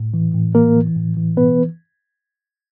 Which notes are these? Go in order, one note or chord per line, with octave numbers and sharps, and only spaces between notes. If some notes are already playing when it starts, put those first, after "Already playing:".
Already playing: A2
E3
A2
E3 A#3 A#4
E3
A2
E3
B2 B3 B4